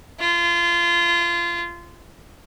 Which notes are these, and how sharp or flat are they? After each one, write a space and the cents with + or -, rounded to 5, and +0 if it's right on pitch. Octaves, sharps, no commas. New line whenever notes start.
F4 -25